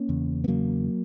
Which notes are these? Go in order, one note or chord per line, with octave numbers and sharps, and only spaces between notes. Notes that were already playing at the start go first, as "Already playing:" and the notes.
Already playing: A#3 C#4
E2 C#3
B3
E2 C#3 F#3 A#3